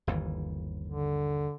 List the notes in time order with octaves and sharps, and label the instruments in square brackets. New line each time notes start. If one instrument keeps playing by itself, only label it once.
[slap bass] G1 D#2 E3
[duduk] D3